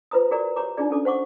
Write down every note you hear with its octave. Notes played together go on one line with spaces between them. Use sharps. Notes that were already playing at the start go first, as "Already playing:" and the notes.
F4 B4 C5 A#5 D#6
F#4 G#4 A#4 D5 A#5
G4 C#5 A#5 D6
D4 D#4 F4 G#4 D5
C#4 D4 A4 D6
C5 F#5 C#6 D6